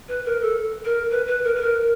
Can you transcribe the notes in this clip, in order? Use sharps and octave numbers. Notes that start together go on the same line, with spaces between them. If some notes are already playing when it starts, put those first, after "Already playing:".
B4
A#4
A4
A#4
B4
B4
A#4
B4
A#4